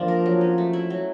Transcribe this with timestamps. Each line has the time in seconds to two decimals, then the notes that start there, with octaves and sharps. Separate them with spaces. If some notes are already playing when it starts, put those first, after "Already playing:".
Already playing: F3 A#3 D4 F4
0.08 A#4
0.26 F#3
0.41 C#4
0.58 A3
0.73 E4
0.90 F#3